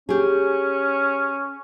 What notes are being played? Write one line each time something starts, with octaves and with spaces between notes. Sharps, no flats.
C#4 G4 G#4